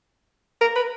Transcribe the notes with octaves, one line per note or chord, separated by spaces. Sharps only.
A#4
B4